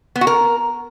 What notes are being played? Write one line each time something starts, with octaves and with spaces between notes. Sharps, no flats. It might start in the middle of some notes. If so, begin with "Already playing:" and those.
B3
F#4
A#4